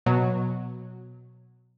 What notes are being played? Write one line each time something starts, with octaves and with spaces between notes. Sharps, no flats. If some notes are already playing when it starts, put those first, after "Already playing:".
B2 F#3